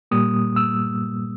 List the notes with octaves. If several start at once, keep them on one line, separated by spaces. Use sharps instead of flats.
A#2 G3 A#3 D#6
E6